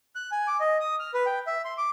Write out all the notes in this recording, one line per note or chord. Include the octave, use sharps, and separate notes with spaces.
F#6
G#5
D6
D#5
D#6
F6
B4
G5
E5
C6
D6